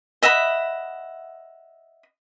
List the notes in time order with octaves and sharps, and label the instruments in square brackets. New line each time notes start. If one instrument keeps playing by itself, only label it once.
[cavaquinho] D#5 E5 F#5 B5